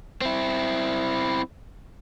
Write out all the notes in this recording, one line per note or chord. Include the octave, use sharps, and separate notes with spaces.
C4 E4